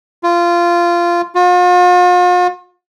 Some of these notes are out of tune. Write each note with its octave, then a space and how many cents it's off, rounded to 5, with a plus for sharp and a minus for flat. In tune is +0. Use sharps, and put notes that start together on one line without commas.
F4 -15
F4 +45